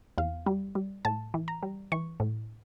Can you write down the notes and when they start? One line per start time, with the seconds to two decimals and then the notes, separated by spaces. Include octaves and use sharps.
0.18 E2 F5
0.46 G3
0.75 G3
1.05 A2 A5
1.34 E3
1.48 A#5
1.63 G3
1.92 E3 C#6
2.20 A2